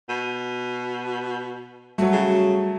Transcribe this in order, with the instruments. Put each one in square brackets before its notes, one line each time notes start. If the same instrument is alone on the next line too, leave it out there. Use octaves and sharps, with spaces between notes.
[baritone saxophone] B2 [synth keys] D#7
[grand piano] F#3 A3 [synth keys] G3 [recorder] F#4
[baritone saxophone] C#3